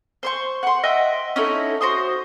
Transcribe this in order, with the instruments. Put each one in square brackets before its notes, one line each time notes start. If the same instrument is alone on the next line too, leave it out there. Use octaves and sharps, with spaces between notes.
[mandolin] C5 C6 C#6
F#5 C6
D#5 E5 F#5 G5
C#4 D#4 E4 A4
F#4 C5 C6 D#6